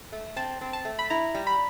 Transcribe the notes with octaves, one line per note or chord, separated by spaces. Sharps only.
A3
C4 A5
C4
A5
A3
B5
E4 A#5
G3
B5